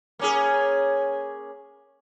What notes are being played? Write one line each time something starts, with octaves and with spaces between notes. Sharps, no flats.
A#3 C#4 G#4